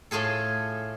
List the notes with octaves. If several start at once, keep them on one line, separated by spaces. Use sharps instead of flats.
A2 A3 F4 G#4 A4